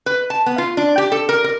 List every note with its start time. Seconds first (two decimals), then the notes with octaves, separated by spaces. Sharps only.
0.06 B4
0.30 A5
0.46 B3
0.58 F4
0.77 D4
0.98 G4
1.12 A4
1.29 A#4
1.44 A#4